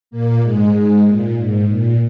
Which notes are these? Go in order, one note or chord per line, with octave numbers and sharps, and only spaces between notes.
A#2 A#3
G#2 G#3
G#2 G#3
A#2
G#2
A#2